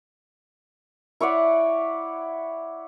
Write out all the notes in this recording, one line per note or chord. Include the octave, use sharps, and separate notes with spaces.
E4 C#5 D5 F#5